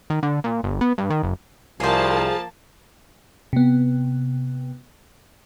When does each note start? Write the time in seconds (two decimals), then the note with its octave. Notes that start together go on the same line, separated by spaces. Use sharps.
0.10 D#3
0.23 D3
0.44 A#2
0.63 G1
0.81 B3
0.98 G2
1.10 D#3
1.23 F#1
1.80 C2 F3 A#3 G#4 C5 A5
3.53 C3 B3